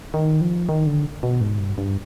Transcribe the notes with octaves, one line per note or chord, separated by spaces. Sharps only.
D#3
F3
D#3
D3
B2
G#2
G2
G2